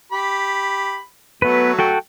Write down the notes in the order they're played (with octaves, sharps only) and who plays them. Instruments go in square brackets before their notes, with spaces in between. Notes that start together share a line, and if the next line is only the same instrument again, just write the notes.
[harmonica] G4 B5
[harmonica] F#3 A3 [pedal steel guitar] B3 B4
[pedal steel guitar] F#4 A4 G5